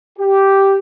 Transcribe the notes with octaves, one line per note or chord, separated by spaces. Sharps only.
G4